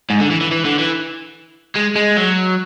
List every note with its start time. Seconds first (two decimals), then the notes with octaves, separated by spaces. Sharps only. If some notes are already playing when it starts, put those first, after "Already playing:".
0.10 G#2
0.20 D3
0.31 E3
0.41 E3
0.51 E3
0.65 D3
0.79 E3
1.75 G#3
1.96 G#3
2.17 F#3